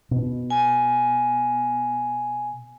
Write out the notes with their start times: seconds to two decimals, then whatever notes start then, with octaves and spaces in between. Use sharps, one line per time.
0.11 B2
0.50 G#5